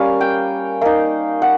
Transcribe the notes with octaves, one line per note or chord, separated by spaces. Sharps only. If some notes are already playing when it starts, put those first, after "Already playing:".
Already playing: G3 A#3 C#4 F5
G5
A#3 D#4 F5
F#5